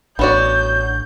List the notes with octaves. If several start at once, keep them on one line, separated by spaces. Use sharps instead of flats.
A1 B3 D4 F#4 C#5 D5 C#6 G6